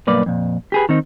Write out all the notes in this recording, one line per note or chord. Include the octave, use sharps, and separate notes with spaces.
B1 G2 A#3 B4 D5
F2 A#2
G4 G#4 B4
D#3 C4 D#4